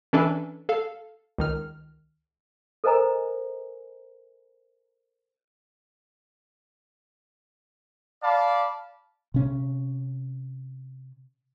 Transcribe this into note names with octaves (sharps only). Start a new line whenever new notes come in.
E3 C#4 D4 A4 B4 E5
A4 F5
C#2 D#3 F6
A4 A#4 C5 D#5 G#5 A#5
D5 F5 A5 B5
C3 C#4